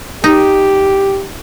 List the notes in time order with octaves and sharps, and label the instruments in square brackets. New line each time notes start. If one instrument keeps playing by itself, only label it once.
[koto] D#4 [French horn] G4